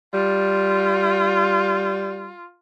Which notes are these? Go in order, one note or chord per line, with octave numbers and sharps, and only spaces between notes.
G3 F4